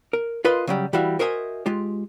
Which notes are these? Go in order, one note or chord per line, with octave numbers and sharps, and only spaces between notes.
A#4
F4 A#4 B4 D#5 F5 C6
C#3 F#3 G3
E3 G3 E4 F#4 E5 F5
F#4 A#4 C5 D#5 E5 G#5
G#3 F4 G4